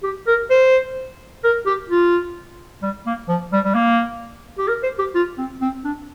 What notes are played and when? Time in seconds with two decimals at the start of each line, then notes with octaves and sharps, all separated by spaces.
0.03 G4
0.27 A#4
0.50 C5
1.44 A#4
1.66 G4
1.89 F4
2.82 G3
3.06 A#3
3.28 F3
3.52 G3
3.65 G3
3.75 A#3
4.58 G4
4.68 A#4
4.83 C5
4.99 G4
5.15 F4
5.38 C4
5.61 C4
5.84 D4